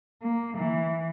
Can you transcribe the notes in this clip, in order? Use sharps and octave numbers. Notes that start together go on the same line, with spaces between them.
A#3
E3